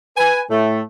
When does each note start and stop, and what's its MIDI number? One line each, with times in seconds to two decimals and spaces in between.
0.17 0.41 71
0.17 0.41 80
0.51 0.83 45
0.51 0.83 57